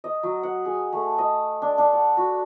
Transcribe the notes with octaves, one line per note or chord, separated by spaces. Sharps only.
D#5
F#3
F#5
G#4
A3
D#5
D4
D4
F#5
F#4